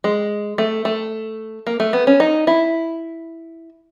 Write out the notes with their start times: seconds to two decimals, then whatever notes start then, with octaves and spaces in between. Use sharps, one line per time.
0.04 G#3
0.58 A3
0.85 A3
1.67 A#3
1.80 A3
1.93 B3
2.07 C#4
2.20 D#4
2.47 E4